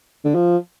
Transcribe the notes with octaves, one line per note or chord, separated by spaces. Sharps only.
D3
F3